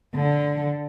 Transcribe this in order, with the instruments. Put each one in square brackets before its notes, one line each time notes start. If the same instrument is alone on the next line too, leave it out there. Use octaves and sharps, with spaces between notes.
[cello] D3